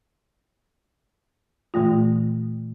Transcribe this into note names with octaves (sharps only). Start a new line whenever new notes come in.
A#2 E3 A3 F4